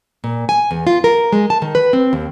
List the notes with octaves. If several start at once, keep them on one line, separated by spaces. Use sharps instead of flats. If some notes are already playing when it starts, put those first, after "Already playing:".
A#2
G#5
E2
F4
A#4
G#3
A5
D#3
B4
C4
D#2